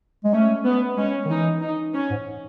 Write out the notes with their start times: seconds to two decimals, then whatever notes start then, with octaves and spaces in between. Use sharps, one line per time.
0.24 G#3
0.33 A3 C#4
0.65 B3
0.97 G#3 C#4
1.26 D#3
1.30 E3 D#4
1.61 D#4
1.94 C#4
2.11 G#2